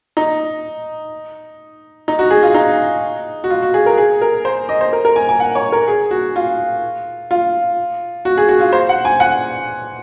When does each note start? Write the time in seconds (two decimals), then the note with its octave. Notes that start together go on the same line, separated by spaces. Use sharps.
0.17 D#4
2.08 D#4
2.19 F#4
2.31 G#4
2.43 F4
2.54 D#4
3.44 F#4
3.50 F4
3.62 F#4
3.74 G#4
3.86 A#4
3.98 G#4
4.22 A#4
4.45 C5
4.69 D#5
4.81 C5
4.93 A#4
5.05 A#4
5.16 G#5
5.29 G#5
5.40 F#5
5.55 C#5
5.72 A#4
5.88 G#4
6.11 F#4
6.36 F4
7.31 F4
8.25 F#4
8.38 G#4
8.49 F#4
8.60 F4
8.73 C5
8.89 F#5
9.05 G#5
9.20 F#5